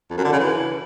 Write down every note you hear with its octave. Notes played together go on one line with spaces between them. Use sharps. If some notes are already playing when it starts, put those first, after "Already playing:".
F2
F#2
D3
C#3
E3